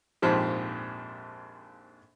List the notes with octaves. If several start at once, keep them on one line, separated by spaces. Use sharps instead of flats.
A#1 F2 G#2 F3 G4